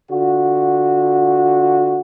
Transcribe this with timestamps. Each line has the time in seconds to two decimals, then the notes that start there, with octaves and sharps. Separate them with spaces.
0.10 D3 F4 F#4